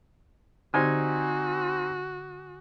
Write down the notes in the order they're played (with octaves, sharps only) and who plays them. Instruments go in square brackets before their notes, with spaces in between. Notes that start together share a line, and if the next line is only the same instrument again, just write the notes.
[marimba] D3 [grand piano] C4 D#4 G4 [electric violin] F#4 [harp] G#5